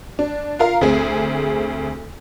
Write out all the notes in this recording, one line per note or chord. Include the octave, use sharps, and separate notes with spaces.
D4
F4 A#4 F5 A#5
D2 C4 G#4